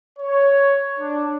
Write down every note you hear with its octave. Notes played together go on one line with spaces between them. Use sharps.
C#5
D4